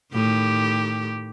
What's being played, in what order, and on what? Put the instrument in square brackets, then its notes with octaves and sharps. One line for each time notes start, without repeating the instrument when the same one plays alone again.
[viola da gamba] A2 D#3 G4